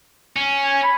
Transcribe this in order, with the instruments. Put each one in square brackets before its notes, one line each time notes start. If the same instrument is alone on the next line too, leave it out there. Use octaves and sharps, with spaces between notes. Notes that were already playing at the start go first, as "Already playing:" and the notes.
[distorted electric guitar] C#4
[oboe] G#5
B5